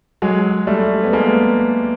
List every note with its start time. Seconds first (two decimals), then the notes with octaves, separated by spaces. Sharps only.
0.22 F#3 G#3
0.67 G3 A3
1.04 B3
1.13 G#3 A#3